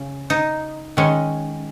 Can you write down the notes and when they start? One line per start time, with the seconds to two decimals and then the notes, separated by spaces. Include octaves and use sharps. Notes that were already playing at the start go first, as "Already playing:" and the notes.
Already playing: C#3 C#4
0.30 D#4
0.97 D#3 G#3 C#4